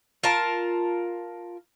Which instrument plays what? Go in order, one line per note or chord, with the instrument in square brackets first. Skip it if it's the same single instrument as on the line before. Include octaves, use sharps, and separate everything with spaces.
[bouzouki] F4 A#4 A5